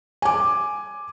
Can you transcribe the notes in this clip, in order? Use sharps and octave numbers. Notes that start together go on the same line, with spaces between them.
G#5 D6